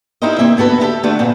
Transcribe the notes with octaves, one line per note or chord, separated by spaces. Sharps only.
D#4 E4 G4 A#4 C5 D#5
C3 A#3 C4 E5
D2 B3 F#4 A4 B4
E4 G4 A4 E5
D3 A3 D4 F4 F#4
A#2 B3 C4